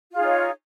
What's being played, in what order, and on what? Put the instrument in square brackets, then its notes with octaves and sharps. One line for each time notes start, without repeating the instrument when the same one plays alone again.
[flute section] F4
G#4
D#4
C#5